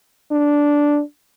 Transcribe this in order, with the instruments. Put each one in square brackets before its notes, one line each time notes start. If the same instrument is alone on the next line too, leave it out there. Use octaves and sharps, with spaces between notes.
[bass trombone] D4